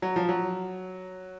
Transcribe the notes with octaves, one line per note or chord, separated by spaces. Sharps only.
F#3
F3
F#3